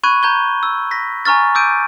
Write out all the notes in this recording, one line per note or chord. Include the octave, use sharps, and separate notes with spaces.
B5 C#6 F#6 G#6 D#7
A#5 G6 G#6 G7
E6
A#6 B6
G#5 A#5 C#6 F6 A6
D6 E6 G6 D7 D#7